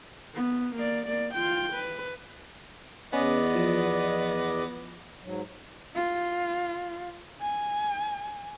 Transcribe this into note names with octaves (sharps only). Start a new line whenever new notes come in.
B3
A#3 D5
A#3 D5
F4 G5
B4
E2 B3 C#4 D5 D#5
F3
G#2 F#3
F4
G#5